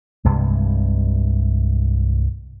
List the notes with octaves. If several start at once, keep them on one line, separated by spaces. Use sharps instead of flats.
C2 G2 C3 G#3